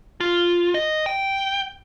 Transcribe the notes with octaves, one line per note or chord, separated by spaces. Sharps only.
F4
D#5
G5